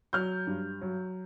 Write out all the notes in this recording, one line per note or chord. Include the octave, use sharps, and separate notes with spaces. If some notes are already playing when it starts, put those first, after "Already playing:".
F#3 F6 G6
G2
F#3